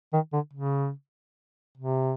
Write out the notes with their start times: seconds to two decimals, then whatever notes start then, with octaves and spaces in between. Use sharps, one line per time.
0.13 D#3
0.33 D3
0.53 C#3
1.78 C3